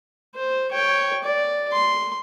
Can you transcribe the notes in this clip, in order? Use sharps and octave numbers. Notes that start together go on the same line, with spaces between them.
C5
C#5 G5
D5
C6